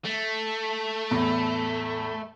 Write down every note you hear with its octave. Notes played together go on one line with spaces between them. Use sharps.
A3
E2 A2